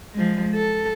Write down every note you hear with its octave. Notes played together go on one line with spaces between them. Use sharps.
F3 G#3
A4